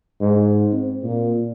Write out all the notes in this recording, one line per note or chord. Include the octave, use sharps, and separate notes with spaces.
G#2
C4
A#2